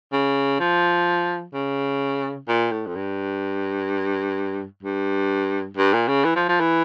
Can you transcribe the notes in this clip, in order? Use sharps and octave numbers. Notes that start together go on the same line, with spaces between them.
C#3
F3
C#3
A#2
A2
F2
G2
G2
G2
A#2
C#3
E3
F3
F3
E3